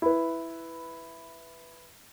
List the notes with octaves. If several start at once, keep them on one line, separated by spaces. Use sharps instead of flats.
E4 B4